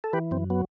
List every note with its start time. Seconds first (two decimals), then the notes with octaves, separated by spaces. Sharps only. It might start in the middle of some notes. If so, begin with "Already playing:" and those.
0.04 A4
0.13 E3 G4 B4
0.31 F#2 C4
0.50 F#3 B3